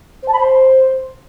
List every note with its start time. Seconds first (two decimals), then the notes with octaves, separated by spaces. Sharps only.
0.23 C5
0.28 A5
0.33 B5
0.39 C5